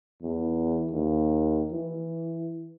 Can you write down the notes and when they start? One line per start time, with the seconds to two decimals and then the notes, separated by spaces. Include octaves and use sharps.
0.23 E2
0.92 D#2
1.72 E3